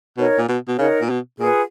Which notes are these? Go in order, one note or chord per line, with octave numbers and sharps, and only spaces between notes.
B2 D#4 A#4 C#5 F#5
A#2
B2
B2
C#3 D#4 A#4 C#5 F#5
A#2
B2
A#2 F4 G#4 B4 F#5